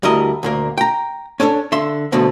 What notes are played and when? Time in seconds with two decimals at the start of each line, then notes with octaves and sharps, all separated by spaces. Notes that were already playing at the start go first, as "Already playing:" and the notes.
0.03 D2 G3 E4 A#4 D#5
0.43 D2 A#2 A#3
0.78 G5 A#5
1.40 C#4 D4 A4 C5 C#5
1.72 D3 E5 C6
2.12 E2 B2 D3 F3 A3